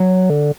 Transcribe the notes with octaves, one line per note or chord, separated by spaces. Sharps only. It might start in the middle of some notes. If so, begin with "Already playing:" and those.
Already playing: F#3
D3